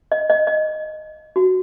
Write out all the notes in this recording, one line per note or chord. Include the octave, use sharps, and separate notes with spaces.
D#5
D#5
D#5
F#4